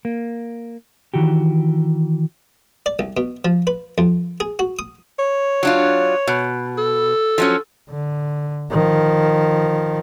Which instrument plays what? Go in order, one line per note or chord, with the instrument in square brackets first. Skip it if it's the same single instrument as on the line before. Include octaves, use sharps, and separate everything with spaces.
[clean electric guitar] A#3
D#3 E3 F#4 G4
[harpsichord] D5
C2
B2
F3
B4
F2
G#4
F#4
D#6
[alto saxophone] C#5
[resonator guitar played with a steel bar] F#3 D4 F4
B2
[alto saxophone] A4
[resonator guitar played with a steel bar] F3 F#3 C#4
[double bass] D3
D#3 F3